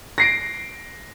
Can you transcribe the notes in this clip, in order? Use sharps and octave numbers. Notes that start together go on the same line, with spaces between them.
A#6 C7 D7